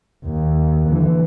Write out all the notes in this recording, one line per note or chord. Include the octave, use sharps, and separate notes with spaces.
D#2
D3 E3